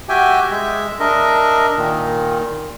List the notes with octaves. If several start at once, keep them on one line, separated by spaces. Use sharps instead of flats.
F#4 G4 E5 G5 G#5
G#3 E5
D4 A#4 D#5 E5
A#2 D#3